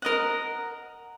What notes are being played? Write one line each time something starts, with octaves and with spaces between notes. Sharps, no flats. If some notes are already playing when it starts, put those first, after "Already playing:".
A#4 D#5 F#5